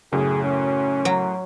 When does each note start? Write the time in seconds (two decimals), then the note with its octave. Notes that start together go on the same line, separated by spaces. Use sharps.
0.13 F#2 A2 C#3 G#4
0.44 C#4
1.05 F#3